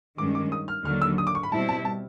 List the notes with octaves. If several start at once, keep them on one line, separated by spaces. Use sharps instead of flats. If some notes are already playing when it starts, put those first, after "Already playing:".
G2 D#3 G#3 C#4 D6
D6
D#6
F6
D#2 D3 F#3 F6
E6
D#6
D6
C#6
B5
B2 G3 C4 E4 A5
A5
A5